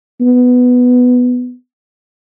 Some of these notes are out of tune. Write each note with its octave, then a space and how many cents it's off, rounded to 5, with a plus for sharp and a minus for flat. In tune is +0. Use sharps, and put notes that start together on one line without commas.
B3 +5